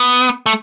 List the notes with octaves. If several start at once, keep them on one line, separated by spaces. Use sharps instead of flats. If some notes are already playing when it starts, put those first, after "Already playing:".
Already playing: B3
A3